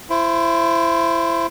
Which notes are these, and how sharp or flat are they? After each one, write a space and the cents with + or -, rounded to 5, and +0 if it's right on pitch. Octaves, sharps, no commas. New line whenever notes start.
E4 +25 C5 +0